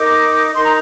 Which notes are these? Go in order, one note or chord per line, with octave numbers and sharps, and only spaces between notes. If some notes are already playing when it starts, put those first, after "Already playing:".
Already playing: D#4 A#4 D6
D#4 A#4 C6
A#5